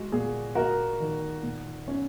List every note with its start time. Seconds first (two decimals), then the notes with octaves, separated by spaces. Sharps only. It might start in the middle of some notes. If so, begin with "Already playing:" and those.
Already playing: G#3 F#4
0.12 A#2 G#4
0.55 A#3 F#4 A#4
1.00 D#3
1.43 A#2
1.88 C#4